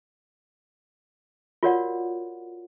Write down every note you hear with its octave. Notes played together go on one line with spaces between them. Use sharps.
F4 F#4 A#4 C#5 D5 F#5